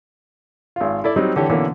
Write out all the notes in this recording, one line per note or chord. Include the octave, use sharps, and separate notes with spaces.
G#1 F4
E4 A4 D5
F#3 G3 C4 D#4
D3 E3 G4 C#5
B2 D3 E3 A#3 C#4